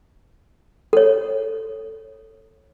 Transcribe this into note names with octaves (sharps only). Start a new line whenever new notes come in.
A4 C#5